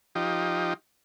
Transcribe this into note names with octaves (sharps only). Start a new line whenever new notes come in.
F3 D#4 G4